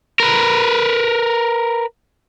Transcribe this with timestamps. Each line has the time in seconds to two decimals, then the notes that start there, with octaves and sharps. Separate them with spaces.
0.20 A#4 B4